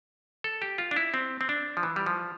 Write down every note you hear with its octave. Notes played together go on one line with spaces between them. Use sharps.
A4
G4
F4
D4
E4
C4
C4
D4
F3
E3
G3
F3